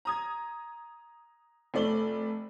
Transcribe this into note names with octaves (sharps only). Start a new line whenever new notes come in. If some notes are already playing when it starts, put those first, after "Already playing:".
A#5 D#6 G#6
F1 A3 D5 F#7 G7